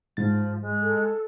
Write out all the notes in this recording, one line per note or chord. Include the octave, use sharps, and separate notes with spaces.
G#2 F3 A6
G#3
A4